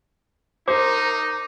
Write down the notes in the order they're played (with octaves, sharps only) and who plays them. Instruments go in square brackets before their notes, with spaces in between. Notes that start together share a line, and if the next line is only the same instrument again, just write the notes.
[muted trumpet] D#4 [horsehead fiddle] A#4 [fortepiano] C5 [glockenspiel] D6